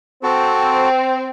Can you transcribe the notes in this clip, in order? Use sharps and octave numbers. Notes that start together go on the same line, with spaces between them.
C4 F#4 A4